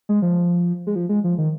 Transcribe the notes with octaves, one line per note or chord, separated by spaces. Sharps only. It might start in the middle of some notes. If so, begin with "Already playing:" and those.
G#3
F3
G#3
F3
G#3
F3
D#3